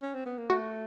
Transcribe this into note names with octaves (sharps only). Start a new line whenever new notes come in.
C#4
C4
B3
A#3
A3 F#4